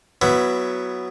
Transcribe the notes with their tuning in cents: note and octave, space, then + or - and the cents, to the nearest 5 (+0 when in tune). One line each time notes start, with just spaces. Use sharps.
F#3 +0 B3 +0 E4 +15